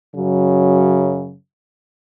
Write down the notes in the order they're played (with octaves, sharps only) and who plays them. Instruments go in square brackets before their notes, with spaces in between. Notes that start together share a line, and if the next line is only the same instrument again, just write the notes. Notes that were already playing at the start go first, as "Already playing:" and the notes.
[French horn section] F#2 C#3 F#3